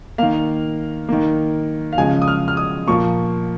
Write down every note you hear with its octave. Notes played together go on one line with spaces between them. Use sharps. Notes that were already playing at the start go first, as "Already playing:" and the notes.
D#3 A#3 F5
D#3 A#3
F5
C#3 F3 G#3 G#5
D#6
F6
F6
D#6
A#2 F3 A#3 C#6